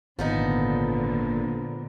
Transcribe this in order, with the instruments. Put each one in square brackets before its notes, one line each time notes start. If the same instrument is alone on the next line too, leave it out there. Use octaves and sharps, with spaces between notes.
[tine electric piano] G#1 [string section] A#2 D3 [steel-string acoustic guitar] F3 B3 D#4